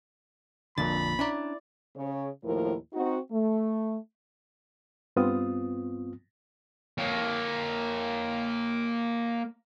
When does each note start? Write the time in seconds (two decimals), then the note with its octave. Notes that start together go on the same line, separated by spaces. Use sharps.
0.78 A#1 F2 A#2 D3 B5 A6
1.19 C#4 D4 E4 D5 A#5
1.96 C#3 C#5
2.44 D#2 A2 F3 E4 A#4
2.93 C4 D#4 F#4
3.31 A3
5.16 G2 B3 C4 F4 D#6
6.98 A#3 C#5